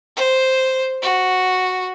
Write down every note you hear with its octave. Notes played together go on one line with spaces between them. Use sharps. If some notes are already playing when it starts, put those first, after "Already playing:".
C5
F#4